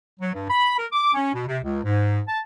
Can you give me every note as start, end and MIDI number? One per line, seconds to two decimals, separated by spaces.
0.20 0.32 54
0.33 0.49 43
0.50 0.75 83
0.78 0.87 70
0.92 1.11 86
1.14 1.33 61
1.33 1.43 47
1.47 1.57 48
1.63 1.78 37
1.84 2.21 44
2.28 2.39 81